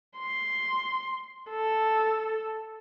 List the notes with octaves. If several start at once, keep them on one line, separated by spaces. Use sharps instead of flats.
C6
A4